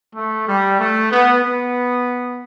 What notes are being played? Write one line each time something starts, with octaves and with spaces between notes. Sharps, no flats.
A3
G3
A3
B3
B3